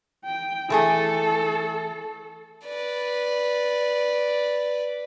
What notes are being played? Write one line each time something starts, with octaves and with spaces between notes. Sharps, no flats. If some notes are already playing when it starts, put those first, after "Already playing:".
G5
E3 A3 G#4 A4
B4 D5